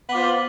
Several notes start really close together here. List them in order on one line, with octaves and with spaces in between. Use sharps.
B3 D5 F4 C5